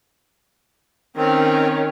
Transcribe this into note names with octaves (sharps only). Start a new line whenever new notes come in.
D#3 C4 C#4